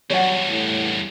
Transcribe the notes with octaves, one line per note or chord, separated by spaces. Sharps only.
E2 G2 F#3 C#5 F#5
A2